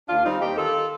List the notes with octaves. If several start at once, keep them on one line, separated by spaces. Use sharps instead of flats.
D#2 D4 F4
G3 C4 D#4
D#2 D#4 G4
D#3 F4 A4